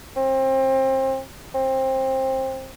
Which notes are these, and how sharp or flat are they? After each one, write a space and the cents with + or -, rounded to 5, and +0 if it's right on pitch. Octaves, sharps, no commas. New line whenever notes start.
C4 +30
C4 +20